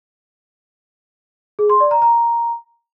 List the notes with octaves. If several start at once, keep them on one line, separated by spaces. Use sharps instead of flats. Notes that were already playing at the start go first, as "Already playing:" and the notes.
G#4
C6
D5
A#5
A#5